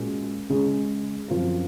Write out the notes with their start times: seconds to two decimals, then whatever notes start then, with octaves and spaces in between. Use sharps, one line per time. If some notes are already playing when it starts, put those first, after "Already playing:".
Already playing: A#2 G#3 C#4 F#4 A#4
0.49 C#3 G#3 C#4 G#4
1.28 F#2 F3 C4 F4 A#4